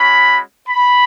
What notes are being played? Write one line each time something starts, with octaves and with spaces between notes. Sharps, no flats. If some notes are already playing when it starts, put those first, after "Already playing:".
Already playing: G#3 C#4 F#4 B5
B5